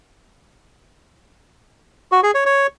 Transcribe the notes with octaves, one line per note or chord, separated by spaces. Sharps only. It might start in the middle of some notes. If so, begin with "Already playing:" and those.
F#4
G#4
C#5
C#5